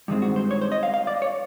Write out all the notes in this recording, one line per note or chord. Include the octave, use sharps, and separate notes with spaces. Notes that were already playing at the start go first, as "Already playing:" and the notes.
G2 D#3 G#3 C4
F#4
C5
C#5
C5
D#5
F5
F5
D5
C#5